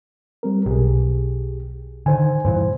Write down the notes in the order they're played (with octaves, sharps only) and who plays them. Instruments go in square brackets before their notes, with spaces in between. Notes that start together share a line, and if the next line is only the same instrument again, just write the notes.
[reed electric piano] G3 C4 A#4
[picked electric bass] B1 [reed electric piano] G4 G#4
[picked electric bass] D3 D#3 [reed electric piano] C5 G#5
[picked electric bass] G2 A#2 E3 [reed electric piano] C5